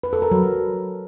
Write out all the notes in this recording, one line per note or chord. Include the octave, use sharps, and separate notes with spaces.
B4
A4
A#4
F#3